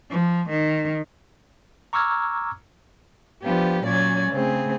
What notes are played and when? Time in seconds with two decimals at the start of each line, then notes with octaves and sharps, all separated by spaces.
0.10 F3
0.50 D#3
1.93 A#5 C#6 D6 E6 F6 G#6
3.43 F3 B3 D4 G4
3.84 A#2 F#3 C#4 D5 G#6
4.30 C#3 A3 C4 G#4